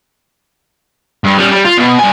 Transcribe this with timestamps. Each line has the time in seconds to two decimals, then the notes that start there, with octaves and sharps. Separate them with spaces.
1.24 G2
1.38 G3 C#4
1.51 G3
1.65 F4
1.78 B2
1.99 G2 G#5